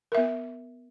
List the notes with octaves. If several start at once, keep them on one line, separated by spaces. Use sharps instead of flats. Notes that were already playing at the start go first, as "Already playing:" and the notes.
B3 A#4 E5